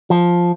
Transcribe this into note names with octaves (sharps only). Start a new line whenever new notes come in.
F3